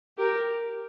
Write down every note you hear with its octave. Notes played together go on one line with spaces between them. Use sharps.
G4 A#4